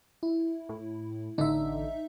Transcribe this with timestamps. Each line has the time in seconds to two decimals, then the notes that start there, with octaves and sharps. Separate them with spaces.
0.23 E4
0.69 A2
1.38 A1 D3 D#4 E5